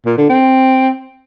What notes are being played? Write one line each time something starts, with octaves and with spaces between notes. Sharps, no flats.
A#2
D3
C4